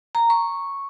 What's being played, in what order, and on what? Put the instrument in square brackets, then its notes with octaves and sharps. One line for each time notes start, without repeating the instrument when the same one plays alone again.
[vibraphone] A#5
C#6